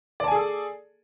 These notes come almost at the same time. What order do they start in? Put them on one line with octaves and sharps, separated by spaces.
D5 A5 G#5 G#4 A4